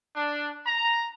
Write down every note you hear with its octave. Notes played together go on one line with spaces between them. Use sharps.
D4
A#5